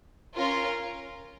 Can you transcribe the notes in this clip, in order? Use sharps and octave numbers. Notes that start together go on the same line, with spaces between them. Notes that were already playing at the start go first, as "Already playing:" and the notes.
C#4 F4 A#4